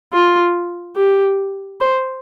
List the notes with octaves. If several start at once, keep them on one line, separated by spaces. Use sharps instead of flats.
F4
G4
C5